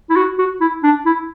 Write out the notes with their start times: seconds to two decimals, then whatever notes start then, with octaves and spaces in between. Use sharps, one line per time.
0.10 E4
0.16 F#4
0.39 F#4
0.61 E4
0.83 D4
1.06 E4